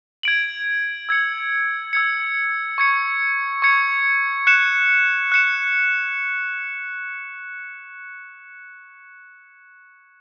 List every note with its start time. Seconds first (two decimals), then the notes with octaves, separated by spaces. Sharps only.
0.23 G#6 D7 F#7
1.09 E6 G#6 C#7
1.93 E6 G#6 C#7
2.78 C#6 G#6 C#7
3.62 C#6 G#6 C#7
4.47 F#6 C#7 E7
5.32 F#6 C#7 E7